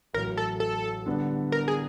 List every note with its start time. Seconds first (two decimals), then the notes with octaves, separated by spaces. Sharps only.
0.14 A1 A2 F#3 A#4
0.37 A4
0.60 A4
1.06 D3 G3 B3 D4
1.52 A#4
1.68 G#4